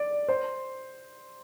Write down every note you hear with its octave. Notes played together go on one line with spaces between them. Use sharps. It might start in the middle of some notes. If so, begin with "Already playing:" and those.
Already playing: D5
C5